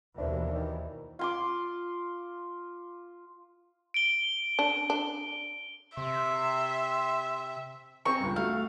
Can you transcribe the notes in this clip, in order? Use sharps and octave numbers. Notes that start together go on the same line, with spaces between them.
D#2 B2 E3 D4 A#4 C5 E5
D#3
F4 C6 D6
D7 G7
D4
D4
C3 E5 C6
C4 G#5 A#5 C#6
C#2 G2
A3 F#4 F5